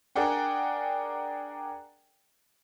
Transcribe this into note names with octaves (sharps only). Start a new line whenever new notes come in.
D4 G#4 A#4 D5 F#5 G5